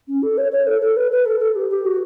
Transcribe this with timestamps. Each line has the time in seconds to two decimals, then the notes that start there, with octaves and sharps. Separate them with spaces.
0.08 C#4
0.23 A4
0.38 C#5
0.52 C#5
0.67 A4
0.81 A4
0.97 B4
1.12 B4
1.26 A4
1.40 A4
1.56 G4
1.70 G4
1.85 F#4